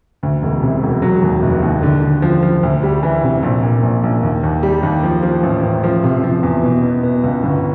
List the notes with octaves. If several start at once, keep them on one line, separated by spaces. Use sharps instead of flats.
D2
E1
C3
E1
F#3
D#2
F1
D#2
D3
D3
F3
F3
D2
G3
E3
C3
A#1
A#2
A#1
A#1
D#2
D#2
G3
D#2
F3
F3
A1
A1
F3
C3
F3
E2
B2
B2
B3
C#2
G1